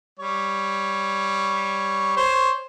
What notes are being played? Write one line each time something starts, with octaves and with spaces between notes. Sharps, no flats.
G3 C#5
C5 C#5